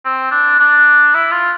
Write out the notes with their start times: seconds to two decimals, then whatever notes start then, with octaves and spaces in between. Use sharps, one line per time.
0.05 C4
0.31 D4
0.59 D4
1.14 E4
1.31 F4